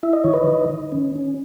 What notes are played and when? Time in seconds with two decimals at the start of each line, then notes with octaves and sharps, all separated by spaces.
0.03 E4 E5
0.13 D#5
0.24 D#3 C#5
0.33 B4 D#5
0.48 D#3
0.70 D#3
0.92 C#4
1.16 C#4